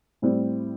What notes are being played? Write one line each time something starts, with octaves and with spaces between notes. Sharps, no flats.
A2 G3 C4